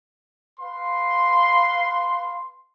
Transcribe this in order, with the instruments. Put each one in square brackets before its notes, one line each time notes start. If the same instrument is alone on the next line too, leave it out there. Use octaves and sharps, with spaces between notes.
[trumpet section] B4 F5 C6